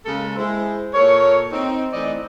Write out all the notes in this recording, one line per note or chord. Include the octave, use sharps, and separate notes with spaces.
C#3 G#3 A#3 A4
G#3 E4 C5
A#2 A4 A#4 C#5
C4 D#4
E3 A3 C4 D#4 D5 D#5